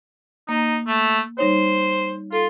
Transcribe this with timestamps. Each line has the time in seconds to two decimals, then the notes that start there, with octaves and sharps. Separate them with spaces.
0.49 A#3 D#4
0.87 A3
1.38 G3 D#4 C5 C#5
2.32 F4 A4